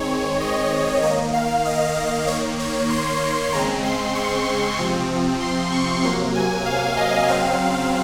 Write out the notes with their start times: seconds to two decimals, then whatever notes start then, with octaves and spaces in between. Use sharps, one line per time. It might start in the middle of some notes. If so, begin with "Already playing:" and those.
Already playing: D#3 G#3 C4 C#5
0.40 D#5
1.02 D#3 A#3 D#5
1.33 F5
1.65 D#5
2.27 D#3 A#3 C#5
2.59 C#5
2.90 C6
3.52 C#3 G#3 C4 A#5
3.84 C6
4.15 C#6
4.78 C3 F3 C4
5.40 C6
5.72 C#6
6.03 C3 F#3 A#3 C6
6.35 G#5
6.65 F5
6.97 D#5
7.28 C#3 F#3 C4 F5